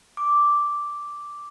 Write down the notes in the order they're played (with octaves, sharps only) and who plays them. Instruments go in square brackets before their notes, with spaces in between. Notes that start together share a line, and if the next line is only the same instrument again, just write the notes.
[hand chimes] D6